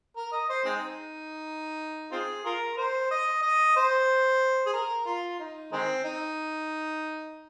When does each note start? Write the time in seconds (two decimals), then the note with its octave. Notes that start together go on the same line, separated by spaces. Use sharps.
0.17 A#4
0.32 D#5
0.49 C5
0.65 G#3 C4 D#4
2.12 C4 F4 G#4
2.45 F4 A#4
2.77 C5
3.11 D#5
3.42 D#5
3.76 C5
4.66 G#4
4.73 A#4
5.06 F4
5.40 D#4
5.72 D#3 G#3 C4
6.04 D#4